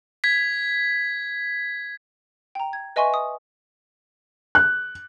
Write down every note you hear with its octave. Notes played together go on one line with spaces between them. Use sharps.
G#6 B6
G5 A#5
G#6
B4 D#5 E5 G#5 C6 C#6
D#6
F#6